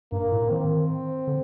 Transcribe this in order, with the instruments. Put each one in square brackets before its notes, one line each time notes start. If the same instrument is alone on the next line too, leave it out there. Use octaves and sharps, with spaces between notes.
[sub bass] G2 [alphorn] A#3
[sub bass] A2
[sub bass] D#3 [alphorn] C4
[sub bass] D3